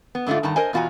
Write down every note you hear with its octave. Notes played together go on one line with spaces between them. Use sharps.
B3
G#2 D3 A3 D4 F4
G2 D#3 A5 A#5
A#4 C5 D#5 G#5
E2 B2 F4 F#4 G#5 A#5